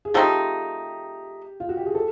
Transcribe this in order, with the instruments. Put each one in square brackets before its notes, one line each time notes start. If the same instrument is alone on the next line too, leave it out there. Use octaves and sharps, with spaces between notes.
[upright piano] G#4
[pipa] F3 A3 C4 D#4 [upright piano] G4
[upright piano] F4
F#4
G4
G#4
A4